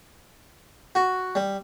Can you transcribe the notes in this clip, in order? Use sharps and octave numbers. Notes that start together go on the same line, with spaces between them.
F#4
G3